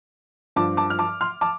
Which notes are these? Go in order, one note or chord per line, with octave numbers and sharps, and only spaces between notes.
G2 F3 A5 D6
A5 D6
F6
A5 D6
C6 F6
A5 D6